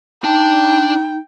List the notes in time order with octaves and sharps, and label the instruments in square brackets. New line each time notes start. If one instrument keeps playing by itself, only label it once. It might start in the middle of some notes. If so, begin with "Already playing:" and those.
[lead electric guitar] D4 A5 [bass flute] D#4 [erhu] G5